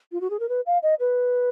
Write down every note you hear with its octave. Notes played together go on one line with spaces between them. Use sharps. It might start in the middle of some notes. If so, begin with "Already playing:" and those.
F4
F#4
G#4
A#4
B4
F5
D#5
B4